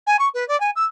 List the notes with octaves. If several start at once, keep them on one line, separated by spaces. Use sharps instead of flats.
G#5
C#6
B4
D5
G#5
E6